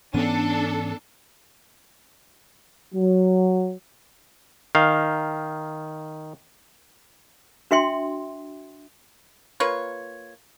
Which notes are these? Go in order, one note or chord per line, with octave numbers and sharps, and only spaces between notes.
G#2 E3 B3 C#4 D4 A4 D#7
F#3
D#3 F5
D4 F#4 E5 G5 C6
A#3 F4 B4 C#5